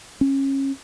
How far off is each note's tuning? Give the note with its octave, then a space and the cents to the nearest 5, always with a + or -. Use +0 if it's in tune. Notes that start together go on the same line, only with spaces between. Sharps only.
C#4 -25